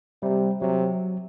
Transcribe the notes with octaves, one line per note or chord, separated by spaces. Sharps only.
C3 G3
C3 F#3